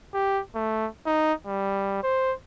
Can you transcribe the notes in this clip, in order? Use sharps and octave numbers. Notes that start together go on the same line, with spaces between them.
G4
A3
D#4
G3
C5